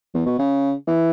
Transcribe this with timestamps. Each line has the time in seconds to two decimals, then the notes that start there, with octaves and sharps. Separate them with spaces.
0.14 E2
0.26 B2
0.39 C#3
0.87 E3